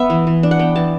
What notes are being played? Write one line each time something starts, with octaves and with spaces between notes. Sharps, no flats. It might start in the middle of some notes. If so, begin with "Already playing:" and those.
Already playing: B3 E5
E3
E3
D4
F#5
B3 G5
E3 A5